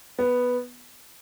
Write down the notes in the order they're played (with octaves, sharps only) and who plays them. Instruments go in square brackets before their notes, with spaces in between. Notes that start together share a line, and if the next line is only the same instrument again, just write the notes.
[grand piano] B3